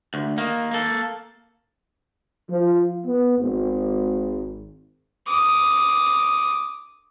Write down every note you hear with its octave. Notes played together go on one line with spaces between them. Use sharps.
D2
D#3 A#3
A#3 A4
F3
B3
G#1
D6 D#6